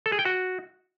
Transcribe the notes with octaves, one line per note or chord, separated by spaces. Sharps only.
A4
G#4
G5
F#4